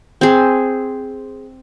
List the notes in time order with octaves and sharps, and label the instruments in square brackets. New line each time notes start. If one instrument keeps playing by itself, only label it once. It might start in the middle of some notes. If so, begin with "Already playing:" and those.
[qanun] C4 G#4